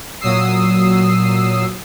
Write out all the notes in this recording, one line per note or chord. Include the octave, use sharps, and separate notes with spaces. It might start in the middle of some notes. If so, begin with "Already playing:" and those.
A#2 F#3 D#6 E6 C7